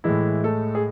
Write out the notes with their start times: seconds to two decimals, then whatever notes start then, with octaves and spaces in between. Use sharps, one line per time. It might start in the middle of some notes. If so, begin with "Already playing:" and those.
0.04 A2 E3 G#3 E4
0.44 A3 A4
0.75 G#4